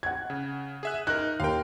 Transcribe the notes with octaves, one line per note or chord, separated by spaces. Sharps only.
F#5 G#6
C#3
G#4 E5 F#6
D#4 A#4 F#6
D#2 A#4 F5 G5